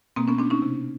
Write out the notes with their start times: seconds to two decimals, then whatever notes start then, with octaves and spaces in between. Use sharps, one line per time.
0.16 B2 A#3 C4
0.28 B3 C#4
0.39 C4 D4
0.50 C#4 D#4
0.62 C3